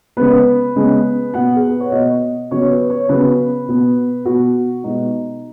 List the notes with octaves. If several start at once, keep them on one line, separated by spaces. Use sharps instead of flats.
C#3 G#3 B3 B4
C#3 G#3 B3
B2 B3 F#5
G#4
B4
C#5
B2 B3 D#5
C#3 F#3 B3 C#5
B4
C#5
C#3 F#3 B3 B4
B2 B3
B2 B3 F#4
B2 G#3 B3 D#4